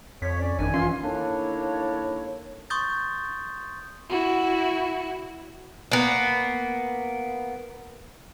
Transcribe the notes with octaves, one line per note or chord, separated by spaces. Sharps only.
F2 C#5 B6
C#4 D5
G#1 F#2 D#3 D4 G#5
E3 C#4 F4 C6
D#3 A3 A#3 D4 E4 C#5
C6 C#6 D#6 G6 A6
E4 F#4
A#3 B3